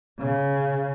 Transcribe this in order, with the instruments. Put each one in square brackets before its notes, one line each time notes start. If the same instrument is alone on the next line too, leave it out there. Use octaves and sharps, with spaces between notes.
[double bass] C#3